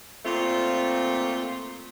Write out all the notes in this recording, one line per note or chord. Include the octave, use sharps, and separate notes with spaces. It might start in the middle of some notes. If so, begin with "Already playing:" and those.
A#2 A3 C4 F4